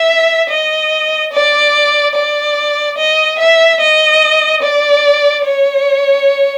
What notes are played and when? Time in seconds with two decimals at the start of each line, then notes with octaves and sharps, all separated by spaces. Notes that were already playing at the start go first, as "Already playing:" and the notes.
Already playing: E5
0.50 D#5
1.33 D5
2.15 D5
2.98 D#5
3.39 E5
3.81 D#5
4.63 D5
5.45 C#5